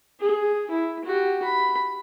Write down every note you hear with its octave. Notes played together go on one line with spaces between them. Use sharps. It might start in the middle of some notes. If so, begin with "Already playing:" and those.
G#4
E4
F#4 G4
B5